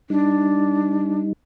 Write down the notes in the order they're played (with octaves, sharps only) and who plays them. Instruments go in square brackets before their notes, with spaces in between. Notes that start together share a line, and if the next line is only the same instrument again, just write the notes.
[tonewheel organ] G3 D#4 [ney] D4